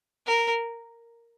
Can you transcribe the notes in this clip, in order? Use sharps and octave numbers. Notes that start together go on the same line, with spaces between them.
A#4